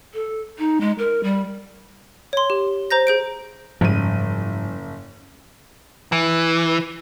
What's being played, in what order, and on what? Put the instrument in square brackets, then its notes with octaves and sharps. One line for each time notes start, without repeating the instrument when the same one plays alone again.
[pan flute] A4
D#4
G#3
A#4
G3
[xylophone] C#5 C6
G4
C5 A#5 G6 A#6
G#4 G6 D7
[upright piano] F#1 D#7 [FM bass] G#2 [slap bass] F3 G3
[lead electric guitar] E3